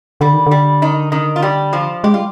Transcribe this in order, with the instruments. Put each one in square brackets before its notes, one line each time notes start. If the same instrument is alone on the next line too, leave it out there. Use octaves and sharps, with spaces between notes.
[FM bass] D3 [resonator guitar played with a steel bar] G3
[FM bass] D#3
[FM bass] D3 [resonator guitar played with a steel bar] G3
[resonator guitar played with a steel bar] D#3 D#4
D#3 D#4
F4
G3 G4
F3 F4
[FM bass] G#3 [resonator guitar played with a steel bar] G4
[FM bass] G3 [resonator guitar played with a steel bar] F4